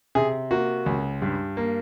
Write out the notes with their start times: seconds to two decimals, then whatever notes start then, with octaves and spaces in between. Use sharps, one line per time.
0.15 C3 G#4
0.51 A#3 F#4
0.86 C#2
1.22 G2
1.57 A#3